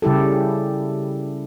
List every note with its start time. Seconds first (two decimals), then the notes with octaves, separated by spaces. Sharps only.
0.02 C#3 G3 E4 G4 A4